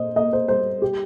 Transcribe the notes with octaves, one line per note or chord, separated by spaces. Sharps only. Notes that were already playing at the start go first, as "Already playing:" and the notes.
Already playing: A#2 C5 D#5
A#3 D#5
C5
G3 C5
G4